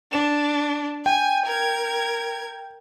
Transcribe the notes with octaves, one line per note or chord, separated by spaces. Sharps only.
D4 E7
G5 G#5
A#4 G#6